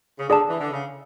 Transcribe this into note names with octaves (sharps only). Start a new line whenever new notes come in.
C#3
D3 G#4 D5 A5
E3
D3
C#3